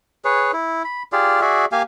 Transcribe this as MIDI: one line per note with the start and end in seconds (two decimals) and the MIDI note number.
0.25 0.52 68
0.25 0.52 71
0.25 0.52 73
0.53 0.83 64
0.85 1.03 83
1.12 1.41 65
1.12 1.41 67
1.12 1.41 68
1.12 1.41 74
1.41 1.65 66
1.41 1.65 68
1.41 1.65 74
1.41 1.65 76
1.72 1.82 58
1.72 1.82 67
1.72 1.82 77
1.72 1.82 80